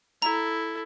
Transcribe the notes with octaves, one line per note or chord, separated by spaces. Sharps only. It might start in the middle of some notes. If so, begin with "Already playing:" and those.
E4 A4 A#5